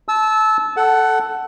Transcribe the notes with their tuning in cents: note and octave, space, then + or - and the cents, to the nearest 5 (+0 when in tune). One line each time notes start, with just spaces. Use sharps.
A5 -25 E6 -15
A4 +0 F#5 +15